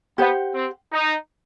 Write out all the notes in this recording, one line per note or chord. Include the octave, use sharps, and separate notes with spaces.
B3 G4 C5 F#5
C4
D#4